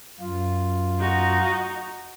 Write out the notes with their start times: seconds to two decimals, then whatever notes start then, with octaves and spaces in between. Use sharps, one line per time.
0.20 F#2 F4
1.00 D#4 F#4